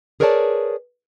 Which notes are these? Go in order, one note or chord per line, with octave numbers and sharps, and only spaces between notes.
G#4 A#4 B4 C#5 D5 A5